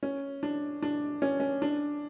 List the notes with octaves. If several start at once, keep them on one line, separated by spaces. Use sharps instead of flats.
C#4
D4
D4
C#4
C#4
D4